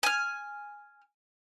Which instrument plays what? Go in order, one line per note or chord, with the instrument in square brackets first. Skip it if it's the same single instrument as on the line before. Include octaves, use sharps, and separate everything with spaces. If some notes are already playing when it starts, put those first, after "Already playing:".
[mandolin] G#5 F6